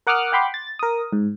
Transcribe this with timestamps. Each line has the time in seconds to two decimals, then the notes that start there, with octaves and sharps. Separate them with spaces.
0.07 A#4 F#5 D6 D#6 F6 F#6
0.32 F#5 G5 B5 C6 D6
0.54 A6
0.79 A#4 D#6
1.13 G#2